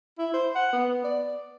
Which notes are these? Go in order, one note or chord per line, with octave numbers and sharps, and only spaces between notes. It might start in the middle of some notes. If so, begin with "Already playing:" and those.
E4
C5
F#5
B3
D5